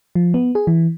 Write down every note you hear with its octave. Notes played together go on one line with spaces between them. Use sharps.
F3
B3
G#4
E3